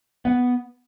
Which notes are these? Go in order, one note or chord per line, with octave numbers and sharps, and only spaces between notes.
B3